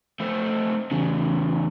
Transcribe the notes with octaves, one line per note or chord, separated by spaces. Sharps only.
A3 C4
E2 C#3